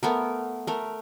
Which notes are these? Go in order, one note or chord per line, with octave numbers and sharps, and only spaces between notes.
A3 B3 A#4
A3 A#4